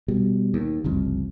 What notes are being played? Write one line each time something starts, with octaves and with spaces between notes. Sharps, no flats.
B2 G3
D#2
F#1 C2 F2